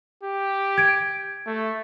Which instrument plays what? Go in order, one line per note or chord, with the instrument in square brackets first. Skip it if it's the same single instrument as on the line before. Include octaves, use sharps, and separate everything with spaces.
[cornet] G4
[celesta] G#6 D7
[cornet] A3